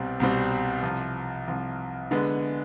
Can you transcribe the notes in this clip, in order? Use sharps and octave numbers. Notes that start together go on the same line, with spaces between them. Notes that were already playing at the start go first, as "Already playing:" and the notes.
Already playing: C2 B2 G3 C4
C2 B2 G3 C4
C2 C3 F3
C2 C3 F3
D3 G#3 B3